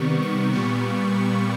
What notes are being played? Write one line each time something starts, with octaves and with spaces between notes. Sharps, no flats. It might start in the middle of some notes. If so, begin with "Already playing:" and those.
Already playing: C3 D#3 G3 B3 C#6
C#6
A#2 G3 B3